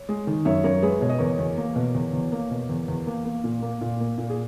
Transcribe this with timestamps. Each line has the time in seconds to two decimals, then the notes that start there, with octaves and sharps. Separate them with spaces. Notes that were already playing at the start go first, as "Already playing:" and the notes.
Already playing: C#5
0.09 G#3
0.27 D#3
0.45 F#2 C#5 E5
0.64 F#2 A#4 C#5
0.82 G#3 G#4 B4
1.01 B2 C#5
1.09 D#5
1.19 E2 A#4 C#5
1.39 E2
1.57 A#3
1.76 B2
1.95 E2
2.13 E2
2.32 A#3
2.51 B2
2.70 E2
2.88 E2
3.07 A#3
3.25 A#3
3.44 A#2
3.62 A#3
3.81 A#2
4.00 A#3
4.18 A#2
4.30 G#4